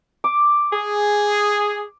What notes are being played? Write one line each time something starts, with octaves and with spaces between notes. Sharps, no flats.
D6
G#4